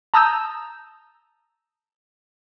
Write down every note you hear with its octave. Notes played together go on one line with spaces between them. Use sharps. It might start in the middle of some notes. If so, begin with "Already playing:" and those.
A5 A#5 D#6 E6 G6